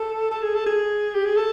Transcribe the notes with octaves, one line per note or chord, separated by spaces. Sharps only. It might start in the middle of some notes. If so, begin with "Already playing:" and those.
Already playing: A4
A4
G#4
A4
G#4
G4
G#4
A4